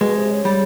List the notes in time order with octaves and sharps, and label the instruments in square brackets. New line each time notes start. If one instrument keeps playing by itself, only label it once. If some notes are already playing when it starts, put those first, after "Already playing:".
[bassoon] B2 [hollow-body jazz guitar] G#3
[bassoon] C3
C#3
[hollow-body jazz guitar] G3